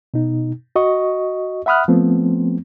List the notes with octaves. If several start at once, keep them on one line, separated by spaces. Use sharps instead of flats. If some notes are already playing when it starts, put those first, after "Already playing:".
B2 D#4
F#4 D#5 C#6
E5 F#5 B5 D#6 F6 F#6
F3 A3 B3 C4